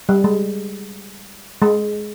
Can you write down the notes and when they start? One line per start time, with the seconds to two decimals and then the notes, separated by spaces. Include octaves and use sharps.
0.09 G3
0.24 G#3
1.62 G#3